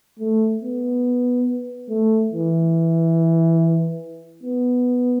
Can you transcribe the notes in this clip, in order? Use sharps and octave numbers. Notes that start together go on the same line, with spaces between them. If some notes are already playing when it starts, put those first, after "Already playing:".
A3
B3
A3
E3
B3